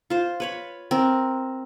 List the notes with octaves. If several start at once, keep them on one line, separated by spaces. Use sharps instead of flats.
F4 C5
B4 C#5 B5
C4 A#4